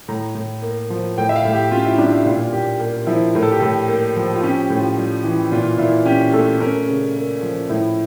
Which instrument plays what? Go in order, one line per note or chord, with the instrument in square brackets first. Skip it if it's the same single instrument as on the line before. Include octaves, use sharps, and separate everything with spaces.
[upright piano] A2 A#5
A2
A#3
F3
A2 G5
E5
F5
A2
G4
C#4 F4
E4
G3 D4
E4
A#2 F4
A#2 G4
A#3 G4
F3 E4
A2 A#4
A4
G4
A2 A4
A#3
F3
F4
C#4 G4
G4
A2
F4
G3
E3
A#2 F4
A#2 E4
C#4 G4
A3 A4
C#4 A#4
C#3
A#3
F3
A2 E4